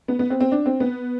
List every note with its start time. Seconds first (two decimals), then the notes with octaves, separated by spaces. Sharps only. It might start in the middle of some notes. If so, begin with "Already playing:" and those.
0.08 B3
0.19 B3
0.30 C4
0.40 C4
0.52 D4
0.66 C4
0.80 B3